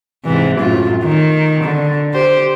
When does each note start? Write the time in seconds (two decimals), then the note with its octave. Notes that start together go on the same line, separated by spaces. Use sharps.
0.25 G#2 C3 E3
0.59 F#2 A2 F4
1.04 D#3
1.64 D3
2.14 G4 C5